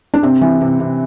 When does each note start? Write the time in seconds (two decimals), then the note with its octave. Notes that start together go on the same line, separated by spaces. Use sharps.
0.14 D4
0.23 C3 C4
0.41 E3
0.61 C3
0.80 C3